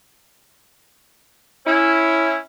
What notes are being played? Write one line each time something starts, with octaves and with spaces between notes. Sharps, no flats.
C#4 E4